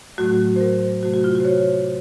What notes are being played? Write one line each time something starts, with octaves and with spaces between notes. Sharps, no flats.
A2 F#3 A3 F#4
C5
A#4
C3 F#3 A3 F#4
F#4
F4
F#4
C5
C#5